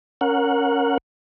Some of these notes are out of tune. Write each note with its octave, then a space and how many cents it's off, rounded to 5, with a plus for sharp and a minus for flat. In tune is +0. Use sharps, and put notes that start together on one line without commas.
C#4 +0 A#4 +0 F#5 -20